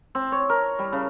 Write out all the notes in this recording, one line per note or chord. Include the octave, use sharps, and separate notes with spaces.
C4
C#5
A#4
G3
C#3